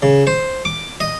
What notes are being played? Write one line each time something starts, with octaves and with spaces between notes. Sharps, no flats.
C#3
C5
D6
D#5